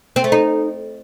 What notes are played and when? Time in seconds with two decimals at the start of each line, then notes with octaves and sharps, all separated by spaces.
0.16 C4
0.24 A3
0.32 D#4